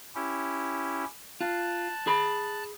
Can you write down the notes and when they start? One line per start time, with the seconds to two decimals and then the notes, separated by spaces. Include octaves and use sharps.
0.15 C#4 E4 G4
1.41 F4 A5 F#6
2.07 G#4 B5